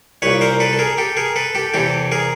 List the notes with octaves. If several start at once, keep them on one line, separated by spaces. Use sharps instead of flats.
C2 A#2 B4 C#5
A#4 C5
A4 B4
A4
G#4 A#4
G4 A4
G#4 A#4
A4 B4
G4 A4
E2 C3 E3 G4 A4
G#4 A#4